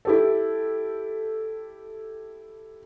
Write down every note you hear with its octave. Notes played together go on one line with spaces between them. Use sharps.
E4 G4 A4